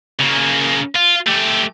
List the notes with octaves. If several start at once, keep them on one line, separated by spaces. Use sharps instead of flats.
C#3 A#3
F4
A3 G4